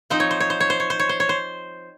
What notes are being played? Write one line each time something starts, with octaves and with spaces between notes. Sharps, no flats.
F3 C4 D#4 C5
C#5
C5
C#5
C5
C#5
C5
C#5
C5
C#5
C5
C#5
C5